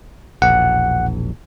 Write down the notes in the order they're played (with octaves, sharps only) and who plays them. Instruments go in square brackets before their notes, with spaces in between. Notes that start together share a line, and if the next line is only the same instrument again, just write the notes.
[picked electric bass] E1 A#1 [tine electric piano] F#5